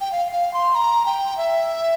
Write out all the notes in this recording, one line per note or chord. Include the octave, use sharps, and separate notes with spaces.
G5
F5
F5
C6
A#5
G5
E5